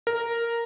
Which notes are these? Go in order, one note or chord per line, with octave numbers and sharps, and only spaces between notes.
A#4